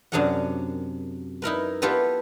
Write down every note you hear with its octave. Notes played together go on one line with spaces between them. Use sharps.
F#2 C3 D4 G#4 A#4 F#5
D#4 E4 A#4 B4
B3 E4 F4 G4 A4 B4